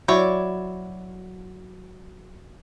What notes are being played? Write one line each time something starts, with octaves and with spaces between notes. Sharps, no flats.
F#3 E4 C#5 D5